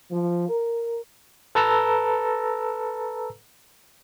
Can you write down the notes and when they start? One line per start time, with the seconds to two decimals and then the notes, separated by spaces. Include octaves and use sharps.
0.11 F3
0.49 A#4
1.55 A4 B4 A5 A#5 E6